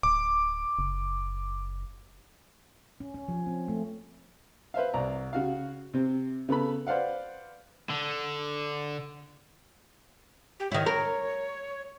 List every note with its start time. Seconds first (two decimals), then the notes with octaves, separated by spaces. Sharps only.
0.03 D1 D6
0.79 F#1
3.00 C#4
3.14 C#4
3.28 F3
3.46 C4
3.68 A3
4.74 B4 C5 E5 F5
4.94 C2 D5 A#5
5.33 C#3 F#4 F5
5.94 C3 C4
6.49 C#3 B3 A4 B5
6.87 B4 C5 D5 F5 F#5
7.90 D3
10.60 G4
10.72 D#3 E4 C#5
10.86 A#4